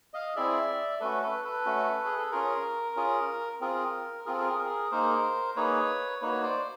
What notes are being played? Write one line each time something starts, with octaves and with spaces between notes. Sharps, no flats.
D#5 F5
C4 E4 G#4 D5 E5
A3 C#4 F#4 A4 B4
A4 B4
A4 B4
A3 C#4 F#4
G#4
A4
C#4 F4 G#4 A#4
C#4 F4 G#4
C4 F4 G#4 A#4
C4 F4 G#4 A#4
A4
G#4 A#4
G#4 A#4
A#3 D#4 G#4 A#4 C5
A#3 D#4 G#4 B4 C#5
A#3 D#4 F#4 B4 C#5
C5 D5